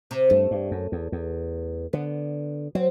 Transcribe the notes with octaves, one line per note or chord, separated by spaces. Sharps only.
C3
G2 A3
G2
F#2
E2
E2
D3 B3
F#3 C4